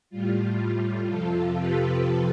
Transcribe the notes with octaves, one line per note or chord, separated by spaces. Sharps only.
A2 G3 F4
F2 C3 F3 F4 A4
G4 B4